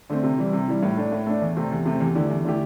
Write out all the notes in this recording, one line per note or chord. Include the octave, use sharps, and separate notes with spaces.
D3 A3 C4
C3
E3 G3 E4
C3
E3 G3 E4
A2
A3 D4
A2
A3 D4
E2
C3 A3 C4
E2
C3 A3 C4
E2
D3 A3 E4 G4
E2
D3 A3 E4 G4